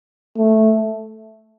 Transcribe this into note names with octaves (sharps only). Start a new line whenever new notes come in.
A3